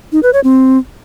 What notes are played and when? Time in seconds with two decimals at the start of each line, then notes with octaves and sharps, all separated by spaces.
0.12 D#4
0.23 B4
0.33 C#5
0.44 C4